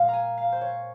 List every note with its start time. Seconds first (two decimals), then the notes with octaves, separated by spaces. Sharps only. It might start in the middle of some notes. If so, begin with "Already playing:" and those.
Already playing: A#2 G#3 F5
0.08 A#5
0.13 G#5
0.37 F5
0.52 C5
0.61 C#5